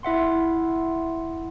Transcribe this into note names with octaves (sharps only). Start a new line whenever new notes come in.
E4 E5 F#5 C6